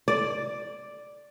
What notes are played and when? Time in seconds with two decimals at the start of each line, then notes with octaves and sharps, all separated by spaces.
0.08 D5